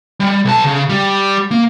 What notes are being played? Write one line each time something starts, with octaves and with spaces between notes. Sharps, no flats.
G3
B1 A5
C#3
G3
A#3